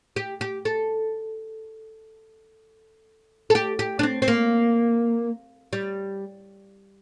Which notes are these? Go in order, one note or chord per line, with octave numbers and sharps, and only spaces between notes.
G4
G4
A4
A4
G4
G4
D4
C4
C4
A#3
G3